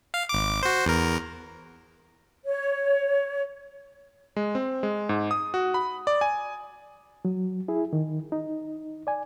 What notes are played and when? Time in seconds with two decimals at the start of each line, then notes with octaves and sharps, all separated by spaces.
0.14 F5
0.29 G#1 D6
0.63 F#4 C5
0.86 E2 A#4
2.45 C#5
4.36 G#3
4.55 C4
4.83 G#3
5.09 G#2
5.31 D#6
5.54 F#4
5.74 B5
6.07 D5
6.21 G#5
7.25 F#3
7.68 E4 G#4
7.93 D#3
8.32 D#4
9.07 D5 G#5